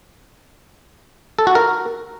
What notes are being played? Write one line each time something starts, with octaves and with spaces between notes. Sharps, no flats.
A4
F#4
A#4